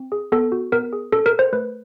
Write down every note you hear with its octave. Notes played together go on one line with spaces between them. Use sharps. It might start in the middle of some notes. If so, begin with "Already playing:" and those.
Already playing: C4
G#4
B3 A4
F#4
B3 A#4
G#4
C#4 A4
A#4
A4
C5
A3 B4